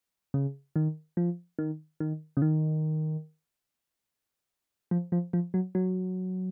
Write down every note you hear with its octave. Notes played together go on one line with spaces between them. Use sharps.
C#3
D#3
F3
D#3
D#3
C#3
D#3
F3
F3
F3
F#3
F#3